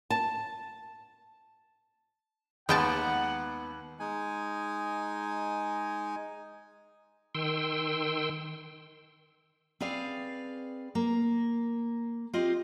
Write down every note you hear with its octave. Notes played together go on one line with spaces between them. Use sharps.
A5
D#2 G#3 B3 F#5 G5 A5
G#3 D#4 G#5
D#3 G5 C6 E6
C4 G#4 B4 D5 F5
A#3
C4 F4 G4 D#5